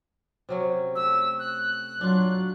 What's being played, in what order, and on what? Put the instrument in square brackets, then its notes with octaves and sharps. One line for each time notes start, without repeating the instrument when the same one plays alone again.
[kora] C3 F#3 C#4
[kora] A3 G4 [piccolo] E6
[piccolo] F#6
[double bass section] F#3 [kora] D4 F4